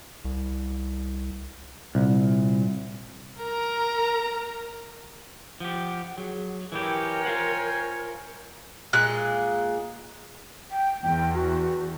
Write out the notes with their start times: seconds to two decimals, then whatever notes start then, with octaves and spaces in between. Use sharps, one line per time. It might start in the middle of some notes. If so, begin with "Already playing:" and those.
0.25 C2
1.95 C2 A#2
3.39 A#4 A#5
5.60 F3 G4 F#5
6.18 F#3 G#4
6.72 E3 E4 G4 A#4 C#5 G5 G#5
7.25 F4 C5 F#5
8.93 A#2 G#3 F#6
10.71 G5
11.03 E2 G5
11.35 F#4